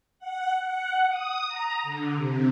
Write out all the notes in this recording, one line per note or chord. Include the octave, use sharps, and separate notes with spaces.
F#5
F#5
D#6
A#5
D3
C3